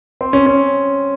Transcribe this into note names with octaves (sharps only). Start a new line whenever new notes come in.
C4
C#4
C#4